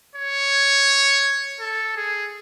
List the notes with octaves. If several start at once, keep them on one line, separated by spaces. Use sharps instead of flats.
C#5
A4
G#4